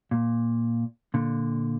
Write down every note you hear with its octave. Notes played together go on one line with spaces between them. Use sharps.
A#2
A#2 D3